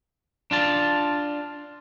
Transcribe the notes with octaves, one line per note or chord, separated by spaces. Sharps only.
D4 F4 A5